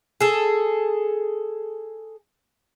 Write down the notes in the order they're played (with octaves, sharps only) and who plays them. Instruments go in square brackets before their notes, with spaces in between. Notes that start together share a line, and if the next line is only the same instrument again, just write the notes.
[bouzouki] G#4 A4